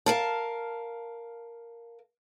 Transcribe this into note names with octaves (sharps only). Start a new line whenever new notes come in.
A#4 F5 A5